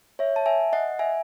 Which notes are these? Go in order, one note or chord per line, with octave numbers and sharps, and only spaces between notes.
C#5 E5
A5
E5 G#5
D#5 F#5
E5 G#5